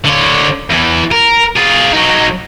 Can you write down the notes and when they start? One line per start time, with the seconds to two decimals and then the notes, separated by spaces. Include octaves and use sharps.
0.05 D3 C#5
0.70 E2 E3
1.12 A#4
1.56 F4 G#4
1.93 F#3 D#4